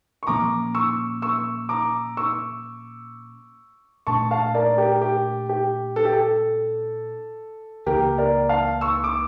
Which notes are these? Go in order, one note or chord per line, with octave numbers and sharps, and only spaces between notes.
C#6
A#2 F3 A#3 C#4 A#5 D6
C#6 E6
C#6 E6
A#5 D6
C#6 E6
A#2 A3 D4 A5 C#6
F5 A5
A#4 D5
G4 A#4
G4
G4
A4
G4
A4
C#2 C#3 E3 A#3 G4 A#4
A#4 D5
F5 A5
C#6 E6
D6